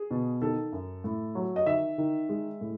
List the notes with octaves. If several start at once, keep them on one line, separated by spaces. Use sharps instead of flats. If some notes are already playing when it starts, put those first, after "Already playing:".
Already playing: G#4
B2
D#3 A4
F#2
A2
F#3
D#5
D#3 E5
D#3
G#3
A2